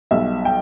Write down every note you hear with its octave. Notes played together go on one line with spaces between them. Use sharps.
B1 B2 G3 E5
G5